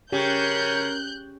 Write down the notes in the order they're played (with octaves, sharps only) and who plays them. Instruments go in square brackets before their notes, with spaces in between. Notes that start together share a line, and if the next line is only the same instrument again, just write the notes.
[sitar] C#3 [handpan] G4 [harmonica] A#4 C#5 [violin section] F#6 G6